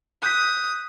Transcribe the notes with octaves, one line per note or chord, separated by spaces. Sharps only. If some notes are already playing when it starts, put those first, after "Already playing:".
D#6 F#6 G6 B6